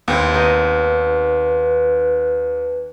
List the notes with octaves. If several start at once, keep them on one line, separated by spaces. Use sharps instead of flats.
D#2 B3 C4 E4
D#3 D#4 B4